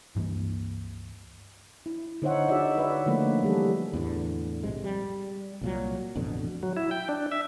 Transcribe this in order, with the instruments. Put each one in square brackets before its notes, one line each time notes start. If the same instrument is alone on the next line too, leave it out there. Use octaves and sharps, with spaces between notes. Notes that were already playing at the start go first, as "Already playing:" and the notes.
[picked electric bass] C#2 G2 E3 A#3
[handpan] E4
D3 D#4 C5 C#5 E5 F#5
D#4 F#4 G#4 C#5 D5 E5
B4 C#5 D5 E5
D3 F3 A3 A#3 B4
E3 G3 G#4 A4
[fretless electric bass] E2 A2 D3
A#1 G#2 C3 G#3
G3
C2 A#2 F#3
A1 F2 B2 D3
[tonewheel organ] F#3
E4
G5
D4
E5